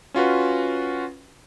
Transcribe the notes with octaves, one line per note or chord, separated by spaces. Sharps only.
C#4 F4 F#4 B4